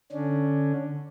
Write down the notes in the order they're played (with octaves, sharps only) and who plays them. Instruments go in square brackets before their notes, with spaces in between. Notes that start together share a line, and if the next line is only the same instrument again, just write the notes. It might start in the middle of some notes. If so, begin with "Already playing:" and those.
[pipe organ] D3 C#4 D4